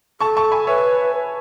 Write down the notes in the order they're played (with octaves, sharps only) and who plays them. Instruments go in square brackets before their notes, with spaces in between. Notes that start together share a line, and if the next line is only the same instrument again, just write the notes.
[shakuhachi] A4 [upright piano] A5 C#6
[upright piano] A5 C#6
G#5 B5
[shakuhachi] B4 [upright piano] C#5 E5